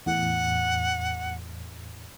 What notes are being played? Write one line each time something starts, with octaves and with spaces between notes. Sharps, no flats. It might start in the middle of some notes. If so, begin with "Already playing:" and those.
E2 A2 F#5